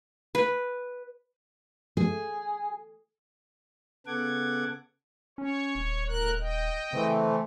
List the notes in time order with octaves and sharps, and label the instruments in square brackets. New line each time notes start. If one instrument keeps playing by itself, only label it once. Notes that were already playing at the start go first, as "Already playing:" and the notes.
[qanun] B4
[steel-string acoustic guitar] G#4
[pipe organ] C#3 B3 A4 F#5 D6 G#6
[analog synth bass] C#4 [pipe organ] C#5
[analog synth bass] D#1
[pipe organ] A2 A#4 F#6
D#5 G5
[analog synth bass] C#3 [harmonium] E3 A3 C4